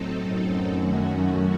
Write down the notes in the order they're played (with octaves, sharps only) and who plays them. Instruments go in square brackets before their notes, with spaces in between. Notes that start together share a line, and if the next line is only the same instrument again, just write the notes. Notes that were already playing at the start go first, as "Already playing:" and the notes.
Already playing: [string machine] A2 F#3 C4 D#4 A4
[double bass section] F#2
[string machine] D#3 A3 C#4 F#4